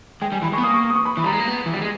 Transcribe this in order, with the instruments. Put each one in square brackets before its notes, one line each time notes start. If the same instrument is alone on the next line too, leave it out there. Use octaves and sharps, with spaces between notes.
[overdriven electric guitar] G#3 [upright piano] G5
[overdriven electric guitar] G3 [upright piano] G#5
[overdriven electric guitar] E3 [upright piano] B5
[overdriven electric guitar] G#3 [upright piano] C#6
[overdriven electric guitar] B3
[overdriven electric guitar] A#3 [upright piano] D#6
[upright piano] C#6
D#6
C#6
B5
[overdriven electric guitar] E3
[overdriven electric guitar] G3 [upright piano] A#5
[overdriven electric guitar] G#3
A#3
B3
E3
G3
G#3